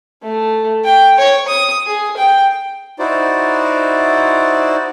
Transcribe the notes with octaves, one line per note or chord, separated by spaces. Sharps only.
A3
G5
C#5
D#6
G#4
G5
D#4 E4 F#4 C5 D5